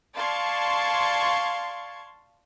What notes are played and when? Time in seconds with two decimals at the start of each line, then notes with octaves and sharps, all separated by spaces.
0.16 D5 F5 A5 C6 C#6 G#6